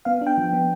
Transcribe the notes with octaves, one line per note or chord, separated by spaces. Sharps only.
B3 F5
D4
G5
F3
B3